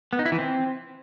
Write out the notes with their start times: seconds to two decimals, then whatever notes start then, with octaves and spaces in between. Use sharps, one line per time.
0.13 B3
0.19 D#4
0.26 E4
0.32 E3
0.39 C4